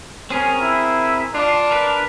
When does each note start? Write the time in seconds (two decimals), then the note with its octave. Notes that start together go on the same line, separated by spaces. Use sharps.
0.30 C4 C#4 G#4 A#4
0.61 E4
1.34 D4 F4
1.71 A#4 B4